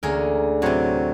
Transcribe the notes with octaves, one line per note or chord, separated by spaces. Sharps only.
D2 A#3 C#4 G#4 A#4
A2 C3 F#3 C4